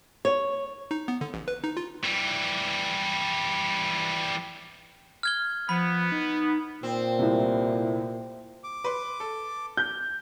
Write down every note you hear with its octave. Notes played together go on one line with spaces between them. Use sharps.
C#5
D#4
B3
D3
A1
B4
D#4
F4
E3 G3
F6 G#6 G7
F3 B3 B5
D#4
A#2 C4
C2 A2 C3
D6
B4 C6
A4
G6